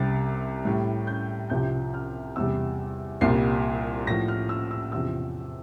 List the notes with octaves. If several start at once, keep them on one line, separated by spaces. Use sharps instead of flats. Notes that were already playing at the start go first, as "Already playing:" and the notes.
Already playing: C2 C3 G3 A6
A2 G3
G6
C2 C3 F3 G6
F6
E2 C3 G3 E6
C2 A#2 G3 C7
A2 F3 A#6
F6
E6
E6
E2 C3 F3 E6